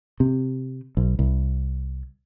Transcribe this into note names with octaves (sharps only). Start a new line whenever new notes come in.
C3
B1
C2